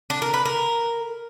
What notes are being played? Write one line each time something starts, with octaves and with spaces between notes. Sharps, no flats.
D4
A#4
B4
A#4